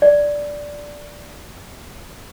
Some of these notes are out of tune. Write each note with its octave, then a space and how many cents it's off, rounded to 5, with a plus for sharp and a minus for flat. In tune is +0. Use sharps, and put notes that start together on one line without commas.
D5 -5